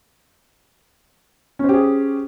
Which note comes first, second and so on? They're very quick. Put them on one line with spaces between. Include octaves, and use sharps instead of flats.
C#4 C5 G4 G#4